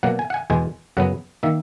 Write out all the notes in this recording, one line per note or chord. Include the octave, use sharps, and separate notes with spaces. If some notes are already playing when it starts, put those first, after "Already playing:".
B2 F#3 A#3 F#5
G#5
F#5
G#5
E2 B2 G#3 G#5
F#2 C#3 F#3 B3 F#5
D#3 A#3 E5